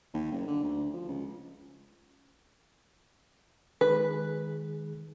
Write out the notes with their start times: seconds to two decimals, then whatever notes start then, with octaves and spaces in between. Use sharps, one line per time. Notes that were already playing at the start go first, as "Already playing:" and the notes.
0.14 D#2
0.32 F#1
0.47 D3
0.63 D2
0.94 F3
1.08 C#2
3.81 D#3 G#3 G#4 B4